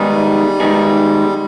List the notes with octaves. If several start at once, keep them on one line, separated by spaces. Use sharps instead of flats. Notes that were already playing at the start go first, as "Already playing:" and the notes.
Already playing: D#3 G3 G#3 B3 D#4 G#4
D#3 G#3 B3 D#4 G#4